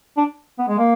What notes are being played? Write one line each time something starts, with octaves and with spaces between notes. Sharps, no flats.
D4
B3
G#3
A#3